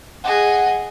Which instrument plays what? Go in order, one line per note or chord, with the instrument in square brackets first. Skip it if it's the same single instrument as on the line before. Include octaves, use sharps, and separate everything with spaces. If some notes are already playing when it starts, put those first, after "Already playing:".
[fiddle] G#4 D#5 [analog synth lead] F#5